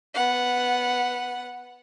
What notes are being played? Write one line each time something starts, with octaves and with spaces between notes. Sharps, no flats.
B3 F#5